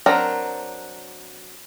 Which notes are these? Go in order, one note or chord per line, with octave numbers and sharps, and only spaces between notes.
F#3 C4 D4 A#4